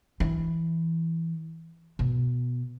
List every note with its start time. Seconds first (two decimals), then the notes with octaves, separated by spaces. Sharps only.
0.20 E3
1.99 B2